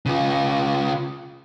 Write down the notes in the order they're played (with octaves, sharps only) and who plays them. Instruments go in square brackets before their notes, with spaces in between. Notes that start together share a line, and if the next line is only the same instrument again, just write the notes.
[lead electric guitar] C#3 F4